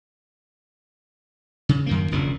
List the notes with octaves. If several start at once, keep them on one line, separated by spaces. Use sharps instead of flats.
C#3
F#2 D#3 A#3
E1 A#1 A#2 C#3